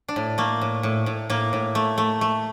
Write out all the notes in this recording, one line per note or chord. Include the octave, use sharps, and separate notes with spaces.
D4
A2
A3 A#3
A2
A2
A2
A2 A#3
A2
A3
A3
A3